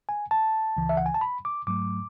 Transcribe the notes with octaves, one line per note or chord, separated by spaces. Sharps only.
G#5
A5
C#2 C#3 E3
E5
F#5
G#5
A5
B5
D6
G#2 F#3 A3 D6